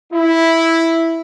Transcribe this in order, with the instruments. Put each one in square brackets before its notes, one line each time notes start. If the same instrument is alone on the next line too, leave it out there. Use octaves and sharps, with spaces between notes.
[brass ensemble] E4